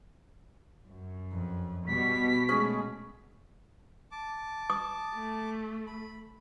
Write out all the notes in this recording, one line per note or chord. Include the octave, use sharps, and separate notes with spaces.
F#2
F2
B2 G3 B6
G#3 A3 C#4 G#4
A5 D6
D#6
A3
B5